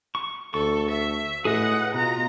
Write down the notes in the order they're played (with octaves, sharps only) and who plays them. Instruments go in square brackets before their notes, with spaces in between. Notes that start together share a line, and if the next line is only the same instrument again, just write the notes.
[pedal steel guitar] C#6
[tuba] D2 [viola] A4 [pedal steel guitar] C#6
[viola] E5
[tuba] A2 [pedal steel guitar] G#4 D#5 D#6 [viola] B4 F#5
[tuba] B2 [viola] F4 A#5